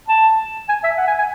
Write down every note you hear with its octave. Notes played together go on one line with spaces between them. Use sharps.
A5
G#5
E5
F#5
G#5
G#5